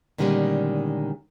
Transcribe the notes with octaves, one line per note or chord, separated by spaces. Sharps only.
A#2 D3 D#3 G3 G#3 C#4